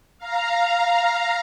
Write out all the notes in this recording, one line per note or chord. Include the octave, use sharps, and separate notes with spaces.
F5 A#5